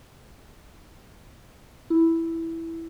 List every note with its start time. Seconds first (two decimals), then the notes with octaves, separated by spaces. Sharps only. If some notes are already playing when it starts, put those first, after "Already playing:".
1.90 E4